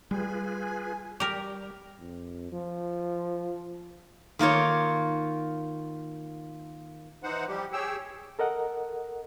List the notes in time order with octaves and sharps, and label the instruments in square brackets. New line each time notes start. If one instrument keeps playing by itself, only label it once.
[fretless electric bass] G3 [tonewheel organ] F4 G#4 B4 [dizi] G#5
[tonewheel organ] G3 [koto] G4 A#4
[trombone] F2
F3
[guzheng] D#3 A#3 F4 C#5
[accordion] E3 D#4 C5 F#5
F3 G3 G4
G4 G#4 C#5 G5 E6
[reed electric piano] A4 A#4 D#5 F#5